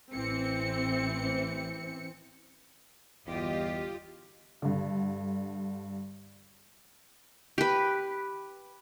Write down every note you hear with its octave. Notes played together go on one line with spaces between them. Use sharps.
A1 E3 C4 C#7
G1 E2 F4 G4 D#5
G2 D3
G4 B4